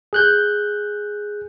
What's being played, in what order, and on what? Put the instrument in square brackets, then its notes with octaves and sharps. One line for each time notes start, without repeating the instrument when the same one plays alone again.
[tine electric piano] G#4 F#6 G6